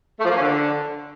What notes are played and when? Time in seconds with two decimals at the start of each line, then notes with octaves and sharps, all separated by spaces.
0.19 A3
0.24 F3
0.30 A#3
0.35 C#4
0.41 D3